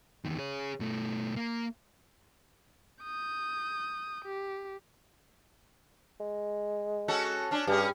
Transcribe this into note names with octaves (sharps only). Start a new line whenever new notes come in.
E2 D#3
G#4 C#5
B2 A3
A#3
D#6 G6
G4
G#3
C#4 F#4 A4
C#4 D4
G2 G3 C#4 G#4